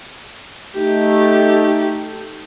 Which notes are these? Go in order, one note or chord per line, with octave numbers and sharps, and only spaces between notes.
A3 D#4 G4